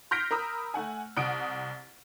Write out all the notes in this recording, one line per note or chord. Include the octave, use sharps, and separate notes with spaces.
C6 F6 G6 A#6 B6 D7
A#4 A#5 B5 D#6 E6
A3 F#5 G#5
C2 F#5 D#6 D7